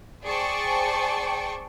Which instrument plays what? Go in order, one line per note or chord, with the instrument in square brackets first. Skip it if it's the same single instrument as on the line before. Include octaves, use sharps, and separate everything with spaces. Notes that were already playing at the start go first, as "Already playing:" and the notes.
[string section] G#4 C5 D5 G5 A5 C#6